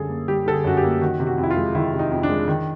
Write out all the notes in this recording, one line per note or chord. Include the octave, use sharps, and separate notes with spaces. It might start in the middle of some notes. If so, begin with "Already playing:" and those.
Already playing: F#2 D3 G3 G#4 A4
A#3
G3 G4
D3 A4
G#4
F#2 F#4
G4
A#3
D#3 F#4
C3
F#4
F2
E4
F4
G#3
D#3 E4
C3
D#4
F2
D4
G#3
D#3